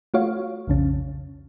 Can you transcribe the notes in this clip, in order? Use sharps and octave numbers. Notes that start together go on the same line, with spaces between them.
A3 F4 F#4 C#5 F5
B1 F2 C#3 C#4